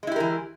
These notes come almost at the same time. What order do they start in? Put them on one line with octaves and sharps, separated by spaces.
G#3 E4 G4 A#4 E3